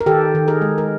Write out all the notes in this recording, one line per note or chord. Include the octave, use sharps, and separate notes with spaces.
A#4
D#3 G4 A4
D#3
G#4 A#4
G#3
A#4